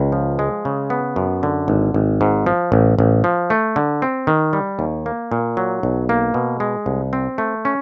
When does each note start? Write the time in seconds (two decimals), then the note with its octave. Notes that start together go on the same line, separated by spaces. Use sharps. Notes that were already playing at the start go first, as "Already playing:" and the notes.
Already playing: C#2
0.12 F3
0.39 G#3
0.65 C#3
0.90 B3
1.16 F#2
1.43 D3
1.68 G#1
1.94 G#1
2.21 G#2
2.46 F3
2.72 A1
2.99 A1
3.24 F3
3.50 A3
3.76 D3
4.02 C4
4.27 D#3
4.53 G3
4.79 D#2
5.06 A#3
5.32 A#2
5.57 F#3
5.83 B1
6.09 A#3
6.34 B2
6.60 G#3
6.86 C2
7.13 C4
7.38 A3
7.65 C#4